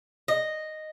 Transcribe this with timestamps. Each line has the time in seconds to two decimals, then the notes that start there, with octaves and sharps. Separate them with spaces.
0.28 D#5